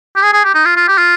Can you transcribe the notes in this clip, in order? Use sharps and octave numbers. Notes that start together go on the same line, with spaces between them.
G4
G#4
G#4
G4
D#4
F4
F4
G4
F4